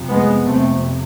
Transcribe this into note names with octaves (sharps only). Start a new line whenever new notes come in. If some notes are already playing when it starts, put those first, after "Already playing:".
Already playing: F2 C3
G#3 B3
F2 C3 A3 C4